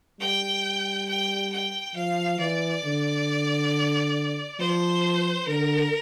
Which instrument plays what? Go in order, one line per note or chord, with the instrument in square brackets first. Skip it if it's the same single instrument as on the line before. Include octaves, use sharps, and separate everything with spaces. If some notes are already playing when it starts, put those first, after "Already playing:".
[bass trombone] G3 [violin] G5
[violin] G5
G5
[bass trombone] F3 [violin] F5
[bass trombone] E3 [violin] D5
[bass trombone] D3
[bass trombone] F3 [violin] C5
[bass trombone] D3 [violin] A#4